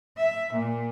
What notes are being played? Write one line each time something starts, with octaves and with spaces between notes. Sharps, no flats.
E5
A#2